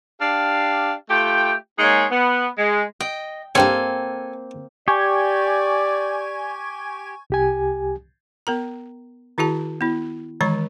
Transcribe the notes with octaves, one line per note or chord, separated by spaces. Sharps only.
D4 G4 F5
A3 F4 G4 G5
G#3 A#3 D#4 G#4 C#5
B3
G#3
D#5 G5
G2 A#3 C4 A4 C#5 G5 G#5
G4 D5 G#5 C#6 G#6
C2 G4 G#5
B3 A#4 A#5
D#3 E4 F#4 G#4 A5
B3 E4
D#3 E3 G#3 C#5 B5 C#6